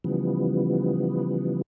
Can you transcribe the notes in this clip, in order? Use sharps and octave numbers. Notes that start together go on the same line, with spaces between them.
C#3 E3 F3 G3 B3